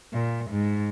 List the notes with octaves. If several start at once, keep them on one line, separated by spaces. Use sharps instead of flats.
A#2
G#2